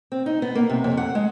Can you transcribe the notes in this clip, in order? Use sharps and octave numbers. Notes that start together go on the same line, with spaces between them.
C4
D#4
B3
A#3
C3
F2
F#5
G#3